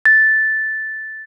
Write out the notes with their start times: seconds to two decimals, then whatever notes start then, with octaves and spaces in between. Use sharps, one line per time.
0.05 A6